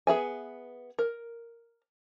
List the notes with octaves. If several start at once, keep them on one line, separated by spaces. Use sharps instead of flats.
B3 G#4 E5 G#5
A#4